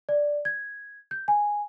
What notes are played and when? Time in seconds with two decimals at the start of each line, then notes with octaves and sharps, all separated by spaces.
0.09 D5
0.45 G#6
1.11 G6
1.28 G#5